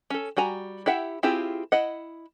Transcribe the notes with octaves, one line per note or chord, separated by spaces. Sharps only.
C#4 A4
G3 F#4 G#5 A#5
E4 G4 E5 F#5
C4 E4 F4 G4 G#4
E4 D#5 F#5